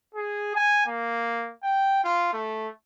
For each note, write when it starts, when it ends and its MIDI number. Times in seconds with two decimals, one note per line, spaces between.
0.15 0.53 68
0.56 0.86 80
0.87 1.51 58
1.63 2.00 79
2.04 2.29 65
2.33 2.68 57